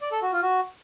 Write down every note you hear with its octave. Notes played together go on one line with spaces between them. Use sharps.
D5
A4
F#4
F4
F#4